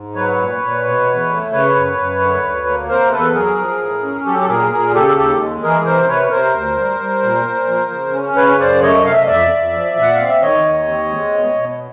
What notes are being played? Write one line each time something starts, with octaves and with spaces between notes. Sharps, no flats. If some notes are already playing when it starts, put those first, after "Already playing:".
Already playing: G#2
F#3 B4 C#5
A#2
A#2
B2
E2
A3
C#3 B4 C#5
F#2
F#2
D3
D2
A#3
C3 A#4 C5
E2 A4 B4
F#3 G#4 A#4
F3
A2
C#4
F#3 G4 A4
A4
A#2 G#4 A#4
A#2 G#4 A#4
C#3 G4 A4
D#2 G4 A4
G#3
E3 G#4 A#4
C3 A#4 C5
C3 B4 C#5
C3 A#4 C5
D2
G3
G3
A#2
A#2
F3
C#3
C#4
C#3 B4 C#5
F#2 C5 D5
A3 C#5 D#5
C3 F5
E5
D#5
F2 D5 E5
F2
F3
A#2
F#5
C4 F5
E5
D#3 C#5 D#5
D#2
C4
G#3
B2
B2